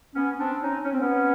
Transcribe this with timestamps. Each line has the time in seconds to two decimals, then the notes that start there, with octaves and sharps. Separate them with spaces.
0.15 B3 C#4
0.39 C4 D4
0.62 C#4 D#4
0.85 C#4
0.93 C4
1.00 B3 C#4